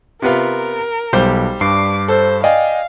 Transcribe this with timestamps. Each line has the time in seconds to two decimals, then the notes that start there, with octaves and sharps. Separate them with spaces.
0.22 C3 B3 F4 A#4
1.13 B1 G3 G4 C5
1.61 G2 D4 D6 C7
2.08 A4 C5
2.44 D5 D#5 F5 G5 G#5